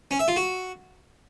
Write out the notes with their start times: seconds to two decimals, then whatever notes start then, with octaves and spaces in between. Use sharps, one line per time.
0.11 C#4
0.19 E5
0.28 F4
0.36 F#4